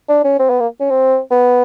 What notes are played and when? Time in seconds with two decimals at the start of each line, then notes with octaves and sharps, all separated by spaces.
0.09 D4
0.24 C#4
0.39 C4
0.50 B3
0.60 A#3
0.80 C#4
0.90 C4
1.31 B3